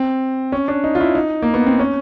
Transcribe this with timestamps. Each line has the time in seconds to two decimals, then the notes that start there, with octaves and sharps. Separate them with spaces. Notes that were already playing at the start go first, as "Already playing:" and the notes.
Already playing: C4
0.52 C#4
0.68 D4
0.84 D#4
0.95 F4
1.00 E4
1.15 D#4
1.42 A#3
1.54 B3
1.66 C4
1.79 C#4